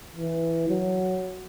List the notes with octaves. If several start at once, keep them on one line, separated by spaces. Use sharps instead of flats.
E3
F#3